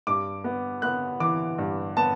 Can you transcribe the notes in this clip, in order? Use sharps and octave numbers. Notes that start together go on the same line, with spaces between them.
G2 D6
B3
B3 F#6
E3 D6
G2
B3 A5